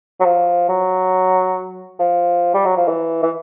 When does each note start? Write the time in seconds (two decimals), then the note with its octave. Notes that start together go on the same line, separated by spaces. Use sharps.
0.20 F#3
0.25 F3
0.69 F#3
1.99 F3
2.54 G3
2.65 F#3
2.77 F3
2.88 E3
3.23 E3